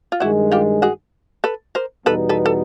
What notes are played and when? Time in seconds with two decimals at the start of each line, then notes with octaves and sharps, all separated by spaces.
0.12 F4
0.20 G2 D#3 G#3 E4 F#4
0.52 F4 G4
0.82 F#4 G#4
1.44 A4 B4
1.75 A#4 C5
2.06 E2 B2 G3 B3 D#4 A4 B4
2.29 A4 B4
2.46 A4